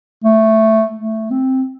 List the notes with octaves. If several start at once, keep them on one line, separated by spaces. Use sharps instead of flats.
A3
A3
C4